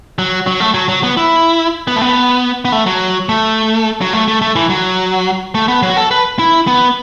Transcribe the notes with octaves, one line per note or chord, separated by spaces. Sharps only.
F#3
F#3
A3
F#3
F#3
B3
E4
B3
A3
B3
B3
A3
F#3
A3
F#3
A3
A3
A3
E3
F#3
A3
B3
F#3
F#4
A4
B4
E4
B3